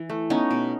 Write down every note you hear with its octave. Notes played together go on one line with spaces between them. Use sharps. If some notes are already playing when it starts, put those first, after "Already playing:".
Already playing: E3
A3
B3 C#4 D#4
B2